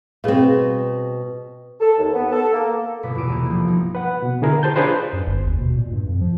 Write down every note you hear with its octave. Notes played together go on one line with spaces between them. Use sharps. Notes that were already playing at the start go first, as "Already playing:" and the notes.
B2 G3 C4 G#4 F5
A4
D#2
B3
A4
A#3
G1 B2 B3 D6 B6
E2 B2 E6 D7 D#7
C2 A#3 B3
F3
D#4
B4 F#5
B2
D3 E4 G#4 A#4
G4 C5 A5 G6
C#4 D4 F4 G#4 B4 C5
F#2
G1
D#2
B2
A#2
G2
F2
F3